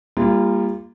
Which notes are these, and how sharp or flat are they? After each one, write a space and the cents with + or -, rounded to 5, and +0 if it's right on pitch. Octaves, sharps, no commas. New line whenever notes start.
G3 +30 A#3 +0 F4 -20